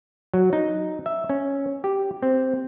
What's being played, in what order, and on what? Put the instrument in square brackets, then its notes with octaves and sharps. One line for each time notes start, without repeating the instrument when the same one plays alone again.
[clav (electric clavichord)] F#3
D#4
E5
C#4
G4
C4